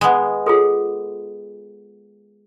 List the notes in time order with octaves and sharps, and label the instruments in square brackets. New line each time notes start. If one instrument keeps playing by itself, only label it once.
[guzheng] G#3 B3
[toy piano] F4 G#4 A4